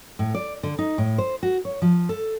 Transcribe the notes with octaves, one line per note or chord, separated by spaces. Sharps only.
A2
D5
D3
D#4
A2
C5
F#4
C#5
F3
A4